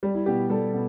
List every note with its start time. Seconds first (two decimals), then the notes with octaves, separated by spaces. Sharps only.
0.03 G3
0.15 E4
0.26 B2 G4
0.49 G3 A4
0.73 B2